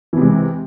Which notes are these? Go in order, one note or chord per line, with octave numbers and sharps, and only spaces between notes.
C3 E3 G#3